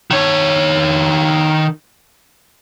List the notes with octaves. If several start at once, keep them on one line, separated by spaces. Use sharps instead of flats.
D#3 C#5